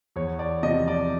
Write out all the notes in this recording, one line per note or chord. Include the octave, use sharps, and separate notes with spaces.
E2 C#5
D5
C3 F3 D#5
D5